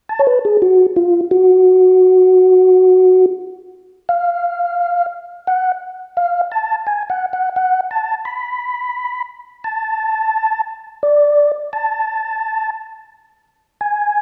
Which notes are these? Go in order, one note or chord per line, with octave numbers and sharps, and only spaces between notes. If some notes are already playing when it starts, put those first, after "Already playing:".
A5
C#5
B4
G#4
F#4
F4
F#4
F5
F#5
F5
A5
G#5
F#5
F#5
F#5
A5
B5
A5
D5
A5
G#5